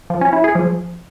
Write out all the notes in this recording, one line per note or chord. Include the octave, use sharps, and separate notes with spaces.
F3
C#4
E4
G#4
F3